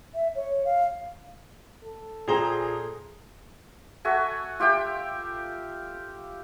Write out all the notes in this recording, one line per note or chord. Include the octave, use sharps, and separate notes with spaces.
E5
C#5
F5
A4
A#2 G#4 C5 G5 A#5 C6 G7
F#4 A4 E5 G#5
F4 G4 E5 G5